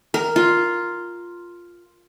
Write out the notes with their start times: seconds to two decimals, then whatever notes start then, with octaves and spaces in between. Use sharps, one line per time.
0.14 A#4
0.36 F4